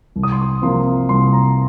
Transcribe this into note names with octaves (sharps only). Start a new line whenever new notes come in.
C2
D#6
C6
D#6
C3 F3 A#3 F4 C6
C2 C6
A#5